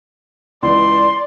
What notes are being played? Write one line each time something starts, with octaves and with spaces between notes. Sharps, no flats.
C#2 E3 D5 C6